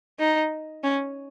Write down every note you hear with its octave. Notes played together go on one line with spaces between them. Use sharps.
D#4
C#4